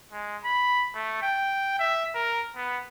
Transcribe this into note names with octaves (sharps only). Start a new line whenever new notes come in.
G#3
B5
A3
G5
E5
A#4
B3